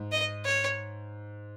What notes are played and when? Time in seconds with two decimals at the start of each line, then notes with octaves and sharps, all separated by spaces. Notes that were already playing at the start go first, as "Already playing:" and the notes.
Already playing: G#2
0.12 D#5
0.45 C#5